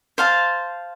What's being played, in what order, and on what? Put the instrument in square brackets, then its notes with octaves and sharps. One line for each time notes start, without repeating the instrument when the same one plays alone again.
[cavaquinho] C5 F5 A5